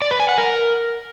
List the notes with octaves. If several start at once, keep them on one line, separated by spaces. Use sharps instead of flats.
D5
B4
G#5
F#5
A#4